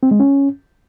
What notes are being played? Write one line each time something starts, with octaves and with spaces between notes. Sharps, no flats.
C4
G#3
C#4